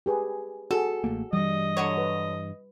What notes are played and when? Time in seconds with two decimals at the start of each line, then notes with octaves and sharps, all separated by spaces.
0.06 G4 G#4 B4
0.71 F#4 G#4 A4
1.04 A1 A3 A#3
1.33 G2 E3 G3 D#5
1.77 D3 F#3 C#5
1.98 B4